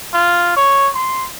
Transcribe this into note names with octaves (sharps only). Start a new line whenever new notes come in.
F4
C#5
C6